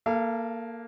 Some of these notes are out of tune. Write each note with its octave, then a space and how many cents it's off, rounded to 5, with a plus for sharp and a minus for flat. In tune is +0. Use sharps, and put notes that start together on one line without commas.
A#3 +0 A4 +0 F5 -40